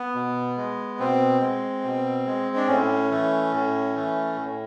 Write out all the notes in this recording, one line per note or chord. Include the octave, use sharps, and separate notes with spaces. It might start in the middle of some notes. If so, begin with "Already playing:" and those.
Already playing: B3
B2
G#3
B2 C4
G#3
B2
G#3
D4
A2 C#4
E3 A3
A2
E3 A3
A2